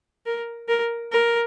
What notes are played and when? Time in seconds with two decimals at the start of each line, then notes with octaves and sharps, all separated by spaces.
0.26 A#4
0.68 A#4
1.12 A#4